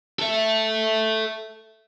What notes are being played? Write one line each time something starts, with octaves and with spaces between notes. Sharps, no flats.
A4 E5